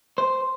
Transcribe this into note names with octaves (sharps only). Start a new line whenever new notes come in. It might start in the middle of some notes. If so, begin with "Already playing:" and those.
C5